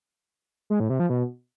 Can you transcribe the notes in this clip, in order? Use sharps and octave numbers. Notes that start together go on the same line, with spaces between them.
G#3
A2
C3
F3
B2